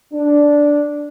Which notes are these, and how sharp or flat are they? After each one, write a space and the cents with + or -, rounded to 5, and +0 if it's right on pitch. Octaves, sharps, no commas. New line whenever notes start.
D4 -5